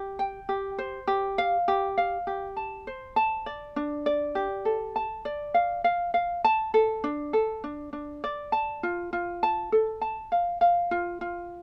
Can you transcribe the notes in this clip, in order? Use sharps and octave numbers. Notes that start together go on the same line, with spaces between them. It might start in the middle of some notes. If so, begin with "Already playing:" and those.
Already playing: G4
G5
G4
C5
G4
F5
G4
F5
G4
A5
C5
A5
D5
D4
D5
G4
A4
A5
D5
F5
F5
F5
A5
A4
D4
A4
D4
D4
D5
A5
F4
F4
A5
A4
A5
F5
F5
F4
F4